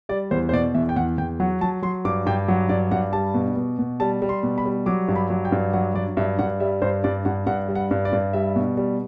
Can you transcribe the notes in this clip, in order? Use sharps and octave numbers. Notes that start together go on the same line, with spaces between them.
G3 D5
E2 C5
C5
B2 D5
E2 E5
G5
E2 F#5
E2 G5
F#3 F#5
F#3 A5
F#3 C6
G2 D6
G2 G5
F#3 F#5
G2 D5
G2 F#5
G3 A5
B2
B2
B2
G3 A5
G3
C6
B2
B5
G3
F#3 D6
G2
B5
F#3
G5
G2
F#3 F#5
F#3 D5
G2 E5
G2 F#5
G3 E5
G2 C5
G2 D5
G2 F#5
G2 F#5
G3
F#5
G2
D5
G2
G3 E5
B2
G3